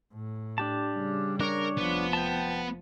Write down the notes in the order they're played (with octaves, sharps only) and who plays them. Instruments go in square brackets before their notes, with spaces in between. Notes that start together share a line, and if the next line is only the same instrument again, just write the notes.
[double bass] A2
[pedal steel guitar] D4 G4 A5
[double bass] C#3 G3
[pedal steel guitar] D4 C#5 [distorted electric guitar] A#4
[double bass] F1 F3 [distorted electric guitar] B3
[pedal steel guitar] G5 A5